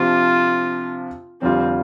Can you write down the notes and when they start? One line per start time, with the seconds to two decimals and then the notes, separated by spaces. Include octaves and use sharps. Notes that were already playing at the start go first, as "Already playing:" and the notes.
Already playing: C3 F3 D4 F4
1.41 F1 F2 D3 G3 C4 F4